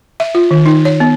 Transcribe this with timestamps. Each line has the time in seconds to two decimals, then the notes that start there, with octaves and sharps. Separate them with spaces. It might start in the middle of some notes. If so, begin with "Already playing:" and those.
0.20 E5
0.35 F4
0.51 D#3
0.66 D#4
0.85 C#5
1.00 B3